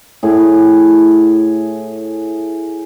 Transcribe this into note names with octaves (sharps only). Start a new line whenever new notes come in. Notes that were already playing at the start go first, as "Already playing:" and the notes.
A2 G#4